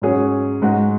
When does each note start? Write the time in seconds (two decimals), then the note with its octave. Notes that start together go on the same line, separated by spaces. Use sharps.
0.02 G#2 F#3 C#4 G#4
0.62 G#2 G#3 F#4